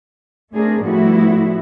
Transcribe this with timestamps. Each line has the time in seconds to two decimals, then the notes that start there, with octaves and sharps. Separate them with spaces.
0.52 A3 C4 D4 G#4 A#4
0.82 A2 F3 G3 B3 E4 F#4